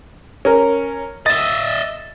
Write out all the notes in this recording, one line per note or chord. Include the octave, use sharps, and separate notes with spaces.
C#4 A#4
D#5 E5 A6